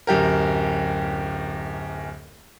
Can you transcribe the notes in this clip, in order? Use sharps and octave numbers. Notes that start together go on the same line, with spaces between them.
D1 F#2 G4 A#4